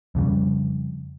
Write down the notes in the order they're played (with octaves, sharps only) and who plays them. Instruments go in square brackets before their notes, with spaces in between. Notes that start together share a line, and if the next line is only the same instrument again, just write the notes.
[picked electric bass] F2 C#3 G3